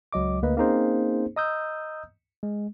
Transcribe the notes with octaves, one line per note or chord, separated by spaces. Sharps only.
C#2 F#3 D#5 D6
D2 A#3 B4 D#5
A#3 C4 C#4 D#4 G#4 C5
D#5 A#5 D#6 E6 G6
G#3